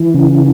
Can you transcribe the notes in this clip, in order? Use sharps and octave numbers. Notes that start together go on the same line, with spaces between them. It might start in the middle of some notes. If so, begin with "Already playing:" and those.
Already playing: E3
C#3